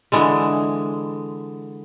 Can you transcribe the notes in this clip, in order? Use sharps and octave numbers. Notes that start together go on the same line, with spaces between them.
D3 E3 G#3